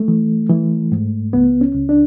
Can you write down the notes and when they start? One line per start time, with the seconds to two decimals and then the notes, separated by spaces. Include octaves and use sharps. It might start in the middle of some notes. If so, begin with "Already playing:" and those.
Already playing: A3
0.08 E3
0.49 E3
0.92 G#2
1.33 C#2 B3
1.61 C#4
1.75 C#2
1.89 D4